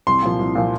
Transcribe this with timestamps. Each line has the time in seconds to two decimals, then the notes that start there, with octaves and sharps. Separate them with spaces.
0.07 C2 C6
0.22 A#2 F3
0.39 C2
0.55 A#2 F3